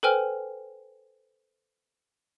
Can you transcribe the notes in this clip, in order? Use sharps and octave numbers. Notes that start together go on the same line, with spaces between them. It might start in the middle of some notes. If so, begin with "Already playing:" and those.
A4 B4 C5 G5 G#5 F6